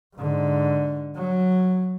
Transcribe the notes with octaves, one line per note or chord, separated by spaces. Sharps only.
G#2 D3
F#3